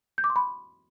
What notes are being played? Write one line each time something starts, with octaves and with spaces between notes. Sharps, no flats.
G6
D6
C6
B5